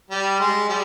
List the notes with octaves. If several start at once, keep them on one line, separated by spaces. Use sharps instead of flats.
G3
G#3
G3